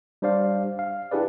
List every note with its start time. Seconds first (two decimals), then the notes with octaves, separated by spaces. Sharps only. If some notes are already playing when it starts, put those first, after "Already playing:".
0.22 G3 D4 C5 D5 F5
0.79 F5
1.11 D4 E4 G4 G#4 B4 D5